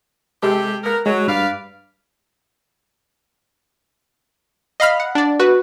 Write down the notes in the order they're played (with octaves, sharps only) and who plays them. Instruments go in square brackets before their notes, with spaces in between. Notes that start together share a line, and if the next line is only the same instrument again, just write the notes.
[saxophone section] C3 G4 [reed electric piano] G#3 A4
[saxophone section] B3 A#4
[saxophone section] F#3 [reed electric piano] G#3
[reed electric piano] G2 [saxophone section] B4 D5 F5
[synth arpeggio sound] D#5 F5 B5 F6
F#5
D4 D5
F#4 B4